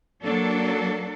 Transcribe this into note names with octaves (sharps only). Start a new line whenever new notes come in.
F#3 A#3 D4 A4